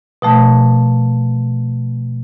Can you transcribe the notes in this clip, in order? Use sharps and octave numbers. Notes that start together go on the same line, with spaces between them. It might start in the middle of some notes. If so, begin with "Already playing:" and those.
B2 F3 A3